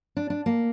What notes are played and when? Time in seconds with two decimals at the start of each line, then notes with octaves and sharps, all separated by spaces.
0.16 D4
0.30 D4
0.46 A#3